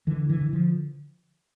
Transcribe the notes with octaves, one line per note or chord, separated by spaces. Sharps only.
D3 E3
E3
D3
F3